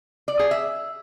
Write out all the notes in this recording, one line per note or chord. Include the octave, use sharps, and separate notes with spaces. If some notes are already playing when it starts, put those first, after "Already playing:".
D5
G#4
E5